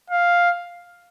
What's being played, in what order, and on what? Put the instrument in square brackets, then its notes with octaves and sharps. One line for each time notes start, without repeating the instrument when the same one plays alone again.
[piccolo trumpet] F5